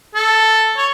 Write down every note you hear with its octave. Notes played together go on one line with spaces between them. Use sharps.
A4
C#5